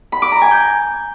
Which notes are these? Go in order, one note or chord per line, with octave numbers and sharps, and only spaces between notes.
B5
D6
A#5
G#5
G6